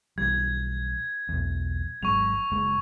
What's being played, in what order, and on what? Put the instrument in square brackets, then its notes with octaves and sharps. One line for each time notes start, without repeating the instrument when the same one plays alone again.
[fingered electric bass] B1 E3 G3 [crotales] G#6
[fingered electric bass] B1 E2
[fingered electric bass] G#1 F#3 G#3 [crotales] C#6 F7
[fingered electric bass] F#1 G#3